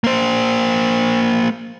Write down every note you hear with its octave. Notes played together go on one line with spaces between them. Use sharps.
A#3 C5